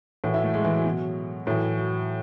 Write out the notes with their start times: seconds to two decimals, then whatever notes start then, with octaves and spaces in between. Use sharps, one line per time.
0.24 A2 E3 F#4
0.34 E4
0.44 A3
0.54 G#3
0.64 E3
0.75 F#3
0.85 B2
1.46 A2 E3 F#3
1.77 F#3